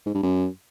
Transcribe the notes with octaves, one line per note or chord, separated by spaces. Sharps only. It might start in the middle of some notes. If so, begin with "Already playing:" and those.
G#2
G2
F#2